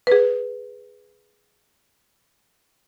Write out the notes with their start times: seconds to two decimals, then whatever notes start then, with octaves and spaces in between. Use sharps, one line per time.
0.07 G#4 B4